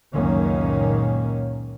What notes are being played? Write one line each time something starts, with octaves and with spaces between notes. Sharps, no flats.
C#2 F#2 A#2 D#3 A#3 C#4